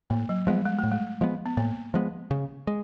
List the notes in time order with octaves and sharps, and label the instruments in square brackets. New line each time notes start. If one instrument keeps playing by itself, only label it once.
[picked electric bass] A2 [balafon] A#3
[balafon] F#3
[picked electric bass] F3 G#3 B3 [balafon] G3
[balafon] G#3
[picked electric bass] A2 [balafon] A3
[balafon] G#3
[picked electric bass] F3 G#3 B3
[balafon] B3
[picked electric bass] A2 [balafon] A#3
[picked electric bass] F3 G#3 B3
C#3
G#3